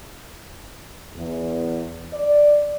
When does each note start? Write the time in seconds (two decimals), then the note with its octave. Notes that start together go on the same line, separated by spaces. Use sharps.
1.16 E2
2.12 D5